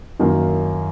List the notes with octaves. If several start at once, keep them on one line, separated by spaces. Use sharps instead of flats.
F#2 D#3 A#3